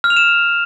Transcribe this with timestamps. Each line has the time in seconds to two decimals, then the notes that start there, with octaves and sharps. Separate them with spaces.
0.04 F6
0.10 F7
0.17 E7